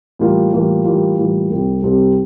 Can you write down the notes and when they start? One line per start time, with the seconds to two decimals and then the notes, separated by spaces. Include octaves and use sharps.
0.19 A2 E3 G3 A#3 F4
0.53 A2 E3 G3 A#3 F4
0.84 A2 E3 G3 A#3 F4
1.17 A2 E3 G3 A#3 F4
1.49 C2 C3 G3 C4 G4
1.82 C2 C3 G3 C4 G4